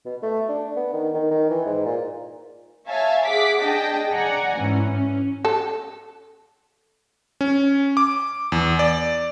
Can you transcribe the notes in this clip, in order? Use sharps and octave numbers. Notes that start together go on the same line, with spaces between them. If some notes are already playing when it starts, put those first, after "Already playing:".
B2
A3
D4
B3
D#3
D#3
D#3
E3
G#2
A#2
C#5 E5 F5 G#5 A5
G#4 F#5 D6 B6
D4 G#4 D#5 G5 A5
D5 F#5 G#5 A#5
G#2 E3 C#4
C#4
A4
C#4
D6
E2
D5